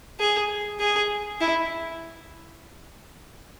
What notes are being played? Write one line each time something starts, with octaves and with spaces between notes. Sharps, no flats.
G#4
G#4
E4